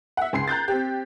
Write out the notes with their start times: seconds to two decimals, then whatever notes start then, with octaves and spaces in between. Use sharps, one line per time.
0.17 E5 F#5
0.33 C#2 C6 C7
0.47 A#5 F#6 G6 A6
0.68 C4 G4